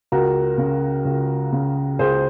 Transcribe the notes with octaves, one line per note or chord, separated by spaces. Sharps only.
C#2 F#4 A#4
C#3
C#2
C#3
C#2 G#4 C5